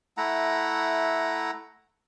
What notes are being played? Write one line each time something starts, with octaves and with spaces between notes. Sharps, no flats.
A3 E4 F#5 A#5